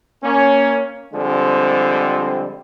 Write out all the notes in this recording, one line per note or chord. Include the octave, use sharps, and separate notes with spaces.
A#3 C#4
D3 F3 G3 G#3 C4